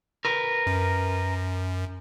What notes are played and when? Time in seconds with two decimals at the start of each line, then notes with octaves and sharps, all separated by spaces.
0.25 A#4 B4
0.67 F#2